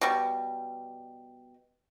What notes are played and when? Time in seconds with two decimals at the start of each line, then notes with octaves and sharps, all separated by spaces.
0.01 B2 G3